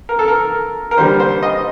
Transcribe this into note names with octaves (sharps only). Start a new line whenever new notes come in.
A#4
A4
A#4
A#4
D3 G3 A#3 C5
C5
D#5